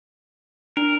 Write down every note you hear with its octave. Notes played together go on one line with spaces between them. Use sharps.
D4 A#4